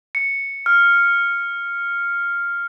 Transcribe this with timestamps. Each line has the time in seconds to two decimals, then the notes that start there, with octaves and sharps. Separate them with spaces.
0.15 C#7
0.66 F6